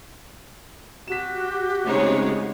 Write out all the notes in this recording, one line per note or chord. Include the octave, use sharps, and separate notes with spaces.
F#4 G4 B6 E7
C#3 G#3 A3 C4 D#4 C#5